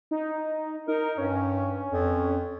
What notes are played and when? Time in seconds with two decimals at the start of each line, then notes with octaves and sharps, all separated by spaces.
0.11 D#4
0.88 D#4 A#4
1.18 G2 C#4
1.92 F2